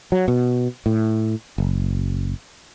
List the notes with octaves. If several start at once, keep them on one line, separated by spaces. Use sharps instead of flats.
F#3
B2
A2
F#1